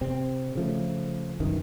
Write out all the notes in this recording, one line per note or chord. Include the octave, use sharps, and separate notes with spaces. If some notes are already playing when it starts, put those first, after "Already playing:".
C3 C4
C#3 F3 A3
C2 F#2 D#3 E3